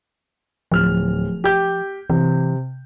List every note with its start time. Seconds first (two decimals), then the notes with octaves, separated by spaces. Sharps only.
0.72 D1 F3 F6
1.44 G4 G6
2.10 C3 E3